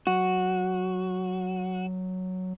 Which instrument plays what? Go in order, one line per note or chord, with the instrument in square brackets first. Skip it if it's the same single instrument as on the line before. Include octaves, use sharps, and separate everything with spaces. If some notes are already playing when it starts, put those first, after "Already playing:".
[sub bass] F#3 [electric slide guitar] F#4